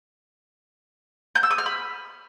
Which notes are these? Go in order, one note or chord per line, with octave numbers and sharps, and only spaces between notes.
G6
E6
D#6
F6
B5